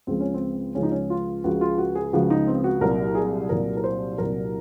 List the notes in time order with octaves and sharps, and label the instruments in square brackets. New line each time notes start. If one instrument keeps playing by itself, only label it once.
[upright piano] C#2 C#3 F3 G#3 C4
C#4
C4
C#2 C#3 F3 G#3 C#4
D#4
C#4
F4
C#2 C#3 F3 G#3 F#4
F4
F#4
G#4
C#2 C#3 F3 G#3 F#4
D#4
C4
F#4
C2 A#2 F#3 A#4
G#4
C2 A#2 F#3 A#4
A#4
C5
C2 A#2 F#3 A#4